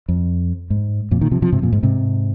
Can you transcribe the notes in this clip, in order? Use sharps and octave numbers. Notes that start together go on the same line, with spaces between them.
F2
G#2
F2 A#2
A#2 D#3
C3 F3
C3 F3
G#2 C3
F2 A#2
G#2
G#2 C3